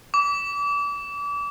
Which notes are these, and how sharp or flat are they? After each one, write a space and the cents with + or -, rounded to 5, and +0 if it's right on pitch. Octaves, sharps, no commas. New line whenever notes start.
D6 -35